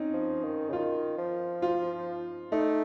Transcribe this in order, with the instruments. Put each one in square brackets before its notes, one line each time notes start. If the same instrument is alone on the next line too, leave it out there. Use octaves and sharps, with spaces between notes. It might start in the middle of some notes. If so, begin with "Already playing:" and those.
Already playing: [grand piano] C4 C#4 D#4
[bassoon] F3
D#3
C#3
[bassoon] D#3 [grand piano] F4
[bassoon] F3
[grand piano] F4
[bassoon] A3 [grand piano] D#4